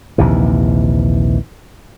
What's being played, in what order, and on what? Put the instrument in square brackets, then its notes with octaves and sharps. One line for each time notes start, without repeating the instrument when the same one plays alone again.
[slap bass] A#1 D#2 C3 E3